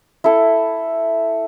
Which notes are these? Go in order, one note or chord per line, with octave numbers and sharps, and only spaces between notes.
E4 A4